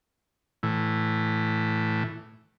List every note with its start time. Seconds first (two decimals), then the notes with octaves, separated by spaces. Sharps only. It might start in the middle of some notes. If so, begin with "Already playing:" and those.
0.63 A2 E3